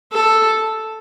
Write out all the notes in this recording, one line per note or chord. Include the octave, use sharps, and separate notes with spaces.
A4